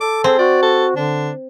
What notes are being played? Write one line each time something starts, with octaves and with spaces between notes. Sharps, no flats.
A4 D6
C4 G#4
F#4 D5
A4
D3 D4